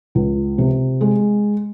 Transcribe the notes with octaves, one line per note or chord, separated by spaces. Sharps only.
C#2
C3
G#3